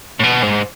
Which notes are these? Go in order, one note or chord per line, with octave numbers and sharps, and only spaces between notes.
A2
B2
G#2